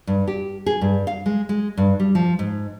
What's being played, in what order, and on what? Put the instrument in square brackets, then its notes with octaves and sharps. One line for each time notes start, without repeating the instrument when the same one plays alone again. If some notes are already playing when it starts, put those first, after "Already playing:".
[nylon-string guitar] G2
G4
G#4
G2
F5
G#3
G#3
G2
G3
F3
G#2